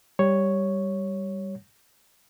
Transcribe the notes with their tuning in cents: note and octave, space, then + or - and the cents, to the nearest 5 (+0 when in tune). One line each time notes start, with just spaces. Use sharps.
G3 +0 C#5 +0